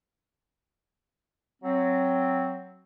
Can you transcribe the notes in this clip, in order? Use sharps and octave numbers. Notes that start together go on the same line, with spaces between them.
F#3 C4